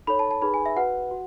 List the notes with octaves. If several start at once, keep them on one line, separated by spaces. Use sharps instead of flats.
D#4 A4 C#5 B5
A5
A5
D#4 G#4 B4 B5
G#5
E5
F#4 B4 F#5
F#4